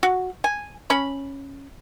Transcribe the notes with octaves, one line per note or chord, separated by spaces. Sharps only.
F#4
G#5
C#4 B5